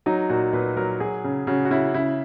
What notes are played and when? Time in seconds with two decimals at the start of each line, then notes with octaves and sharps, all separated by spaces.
0.06 F#3 D#4
0.29 A#2 F#4
0.53 A#2 B4
0.77 F#3 A#4
1.00 F#3 G#4
1.24 C#3
1.47 C#3 F#4
1.65 F#4
1.70 C#3 E4
1.94 C#3 E4